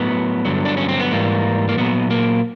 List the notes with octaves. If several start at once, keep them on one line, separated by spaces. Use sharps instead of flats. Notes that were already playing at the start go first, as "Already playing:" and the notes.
Already playing: A2 F#3 B3
G2 D3 F#3
D4
C#4
C4
B3
G#2 E3 G3 A#3
A#3
A#2 F#3 B3
A#3